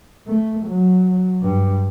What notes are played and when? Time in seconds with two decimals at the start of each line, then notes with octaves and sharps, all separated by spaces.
0.27 A3
0.66 F#3
1.42 G2